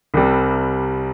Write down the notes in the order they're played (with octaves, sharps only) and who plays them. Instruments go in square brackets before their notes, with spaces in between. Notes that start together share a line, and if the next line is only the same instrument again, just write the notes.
[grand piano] C2 C3 G3